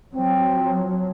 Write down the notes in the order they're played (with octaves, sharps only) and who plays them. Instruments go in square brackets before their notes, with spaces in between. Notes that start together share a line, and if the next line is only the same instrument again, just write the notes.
[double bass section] F3 F#3 [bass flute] C4